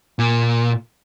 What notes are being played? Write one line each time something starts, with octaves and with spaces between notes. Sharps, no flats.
A#2